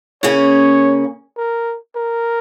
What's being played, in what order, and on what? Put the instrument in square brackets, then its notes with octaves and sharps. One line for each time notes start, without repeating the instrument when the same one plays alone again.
[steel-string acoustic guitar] C#3 A#3 C#4 G#4 [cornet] C#5
[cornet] A#4
A#4